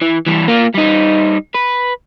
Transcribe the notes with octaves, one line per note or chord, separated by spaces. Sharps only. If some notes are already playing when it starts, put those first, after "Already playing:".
E3
E3 G3
A#3 F4
G3 D#4
B4